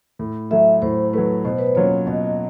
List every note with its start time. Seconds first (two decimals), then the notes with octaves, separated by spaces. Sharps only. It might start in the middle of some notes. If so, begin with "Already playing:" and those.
0.19 A2
0.51 F#3 A3 E5
0.82 A2 C5
1.13 F#3 A3 B4
1.44 B2 C5
1.59 B4
1.67 C5
1.75 F#3 A#3 C#4 F4 C#5
2.07 B2 D#5